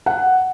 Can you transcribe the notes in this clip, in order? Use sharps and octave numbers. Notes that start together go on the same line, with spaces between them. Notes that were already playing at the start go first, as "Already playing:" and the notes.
F#5